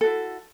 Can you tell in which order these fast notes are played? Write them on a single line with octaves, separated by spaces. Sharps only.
A4 F#4 E4